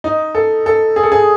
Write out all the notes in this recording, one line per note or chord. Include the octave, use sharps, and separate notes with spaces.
D#4
A4
A4
G#4
A4
G#4